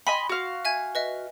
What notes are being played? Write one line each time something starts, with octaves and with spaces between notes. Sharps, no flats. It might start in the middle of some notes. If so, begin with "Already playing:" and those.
D#5 G#5 B5 C6
F#4 F5
E5 G#5 G#6
B4 D#5 E5